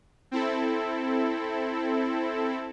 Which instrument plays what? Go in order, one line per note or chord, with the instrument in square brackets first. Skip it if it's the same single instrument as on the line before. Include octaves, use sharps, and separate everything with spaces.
[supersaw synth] C4 E4 A4